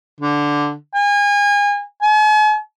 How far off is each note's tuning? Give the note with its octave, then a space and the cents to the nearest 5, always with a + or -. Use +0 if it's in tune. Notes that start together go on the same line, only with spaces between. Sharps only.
D3 -5
G#5 -30
G#5 +45